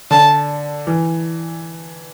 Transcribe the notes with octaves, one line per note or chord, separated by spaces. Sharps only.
D3 A5
E3